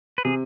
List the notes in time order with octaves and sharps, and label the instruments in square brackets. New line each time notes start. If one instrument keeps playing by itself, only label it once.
[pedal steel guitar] B4
[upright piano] C3 [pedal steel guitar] G#4